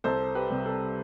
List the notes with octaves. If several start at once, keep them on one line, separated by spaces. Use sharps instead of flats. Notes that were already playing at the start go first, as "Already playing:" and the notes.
C2 A4 C5
G4 B4
C3 G3
A4